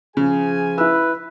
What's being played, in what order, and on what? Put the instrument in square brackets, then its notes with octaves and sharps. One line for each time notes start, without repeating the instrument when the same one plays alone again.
[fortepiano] C#3 [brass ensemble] F3 G#4 G#5
[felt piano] E4 E6 [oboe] B4